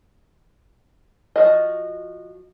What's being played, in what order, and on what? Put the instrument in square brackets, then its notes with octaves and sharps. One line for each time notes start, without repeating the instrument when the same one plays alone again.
[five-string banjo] F3 F#4 D#5